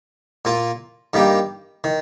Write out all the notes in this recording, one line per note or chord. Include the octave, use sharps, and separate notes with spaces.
A#2 A#3 F4
G2 D#3 G3 A#3 G4
D#3